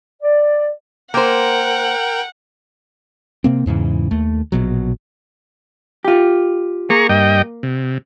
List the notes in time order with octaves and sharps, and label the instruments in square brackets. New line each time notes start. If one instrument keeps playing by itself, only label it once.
[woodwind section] D5
[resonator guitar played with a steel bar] A#3 C5 [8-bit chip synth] A#4 G5 [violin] F#5
[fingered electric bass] C3 A#3 C4
E2 G#2 C#3 E3
D#2 A3
A#1 B2 F#3
[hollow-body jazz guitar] F4 G4
[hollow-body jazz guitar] A#3 [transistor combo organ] G#4 A#5 C#6
[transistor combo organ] G2 D#5 G5
C3